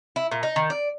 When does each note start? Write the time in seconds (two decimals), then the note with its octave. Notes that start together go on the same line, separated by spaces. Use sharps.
0.16 E4
0.31 A#2
0.43 D#4
0.56 D#3
0.70 D5